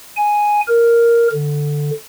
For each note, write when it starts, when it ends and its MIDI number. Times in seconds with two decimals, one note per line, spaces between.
0.17 0.61 80
0.68 1.28 70
1.33 1.91 50